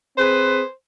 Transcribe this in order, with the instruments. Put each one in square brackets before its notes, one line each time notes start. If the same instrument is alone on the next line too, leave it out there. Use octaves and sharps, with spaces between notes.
[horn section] C4 G#4 B4 [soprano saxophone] C5